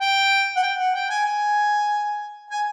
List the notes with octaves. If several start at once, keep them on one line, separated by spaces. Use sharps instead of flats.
G5
F#5
G5
F#5
G5
G#5
G#5
G#5